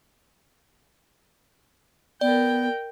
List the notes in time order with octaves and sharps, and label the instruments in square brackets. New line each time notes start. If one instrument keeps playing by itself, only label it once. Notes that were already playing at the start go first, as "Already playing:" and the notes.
[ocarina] B3 [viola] A#4 G5 [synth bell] D5